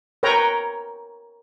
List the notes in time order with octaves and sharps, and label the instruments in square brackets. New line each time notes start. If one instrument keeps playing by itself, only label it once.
[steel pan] A#4 B4 C#5 G5 A#5